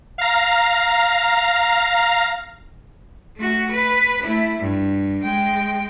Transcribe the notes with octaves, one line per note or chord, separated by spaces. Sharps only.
F5 A#5
A3 F#4
B4
A3 E4
G2
G#3 G5